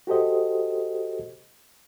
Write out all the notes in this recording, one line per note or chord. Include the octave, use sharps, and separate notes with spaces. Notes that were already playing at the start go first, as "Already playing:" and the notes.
F#4 G4 A4 C5 D#5